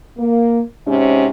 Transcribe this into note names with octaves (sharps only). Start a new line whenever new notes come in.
A#3
G#2 C3 C#4